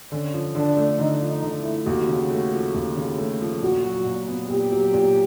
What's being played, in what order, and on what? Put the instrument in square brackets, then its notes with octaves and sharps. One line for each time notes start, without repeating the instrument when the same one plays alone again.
[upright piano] D3 [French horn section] C#4
[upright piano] F3
[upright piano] D3 [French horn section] D4
[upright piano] A3
[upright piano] D3 [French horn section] D#4
[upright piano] F3
[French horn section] D#4
[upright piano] D3
[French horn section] E4
[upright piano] A3
[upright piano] D#2 [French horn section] F#4
[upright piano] C#3
A3
F3
D#2
C#3
A3
F3
[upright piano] A#2 [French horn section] F#4
[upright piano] F#3
A#2
B3
[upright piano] A#2 [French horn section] G4
[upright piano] F#3
A#2